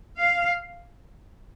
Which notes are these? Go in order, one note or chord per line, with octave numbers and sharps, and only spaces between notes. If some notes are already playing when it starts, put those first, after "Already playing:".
F5